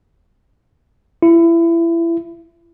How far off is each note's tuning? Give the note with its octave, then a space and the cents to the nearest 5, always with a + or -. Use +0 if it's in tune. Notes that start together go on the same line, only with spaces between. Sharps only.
E4 +25